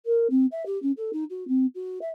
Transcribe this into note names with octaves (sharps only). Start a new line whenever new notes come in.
A#4
C4
E5
G4
C#4
A4
D#4
F#4
C4
F#4
E5